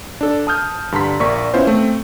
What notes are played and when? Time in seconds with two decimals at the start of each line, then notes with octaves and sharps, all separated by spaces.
0.21 D4 A4
0.47 A5 D#6 F6 G6
0.92 G2 D3 A5 A#5 C6 B6
1.20 A#1 A#3 D5 C#6 B6
1.54 B3 C#4 E4 F4 C5
1.67 A3 C4